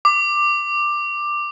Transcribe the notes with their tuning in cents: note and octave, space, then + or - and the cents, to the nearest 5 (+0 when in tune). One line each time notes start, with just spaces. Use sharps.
D6 +10